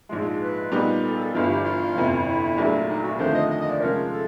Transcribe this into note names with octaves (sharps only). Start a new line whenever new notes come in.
A#1 G#2 F3 G#3
B4
A#2 G3 B3 D#4
A4
A4
G1 G2 E3 F4
G4
F4
G1 F2 C3 E3
E4
A#1 A#2 F#3 A3 D4
D#4
F#4
D#2 D3 F3 A3 C4 C5
D#5
D#5
D#5
D5
C3 F3 G#3 C#4 A#4
A4